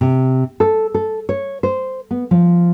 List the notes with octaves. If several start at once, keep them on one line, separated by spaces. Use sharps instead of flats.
C3
A4
A4
C#5
C5
B3
F3